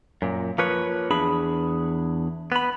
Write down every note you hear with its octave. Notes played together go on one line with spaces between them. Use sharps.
F#2 A#2
F3 A#3 B4 C#5
E2 D4 G#4 B5
B3 B5